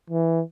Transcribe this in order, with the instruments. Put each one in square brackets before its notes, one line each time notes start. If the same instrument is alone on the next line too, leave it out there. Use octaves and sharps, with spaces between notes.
[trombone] E3